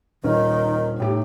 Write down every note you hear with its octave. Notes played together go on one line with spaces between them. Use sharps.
D#1 D#3 C#4 D#4
A2 D#4 G4